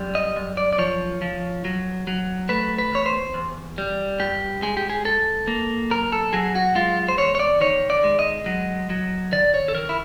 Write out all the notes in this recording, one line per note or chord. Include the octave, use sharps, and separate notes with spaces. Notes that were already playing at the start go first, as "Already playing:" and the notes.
Already playing: F#2 G3
D#5
F#2
D5
D5
F3 C#5
F3
F#3
F#3
A3 B4
B4
E2 C#5
C5
E2
G3
G2 G4
G#3 G#4
G4
G#4
G#2 A4
A#3
B1 A#4
A4
F#3 G#4
F#4
G#3 F4
C5
E2 C#5
C#5
D5
D#3 C#5
D5
G#3
D#5
F#3
F#3
D#3 D5
C#5
A4
D#3 A#4
E4